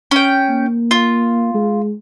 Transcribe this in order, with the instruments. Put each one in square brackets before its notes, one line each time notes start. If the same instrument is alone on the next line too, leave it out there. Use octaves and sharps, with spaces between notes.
[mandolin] C#4 G5
[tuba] A#3
[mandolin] F4
[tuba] G#3